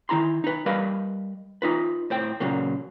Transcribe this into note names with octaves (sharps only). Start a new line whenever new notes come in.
D#3 E4 A#5 C6
D#4 B4
G3 A#4 B4 D#5 F5 B5
D#4 F4 B4
A2 C5 G5
A#2 C#3 F#3 A#3